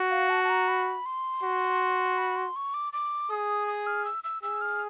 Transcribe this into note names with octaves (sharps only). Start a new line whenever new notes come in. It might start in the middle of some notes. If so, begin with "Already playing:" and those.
Already playing: F#4
F5
A5
A5
A#5
B5
C6
F#4
B5
C6
C#6
D6
D6
G#4 D#6
D#6
F6
E6
E6
G#4 E6
F6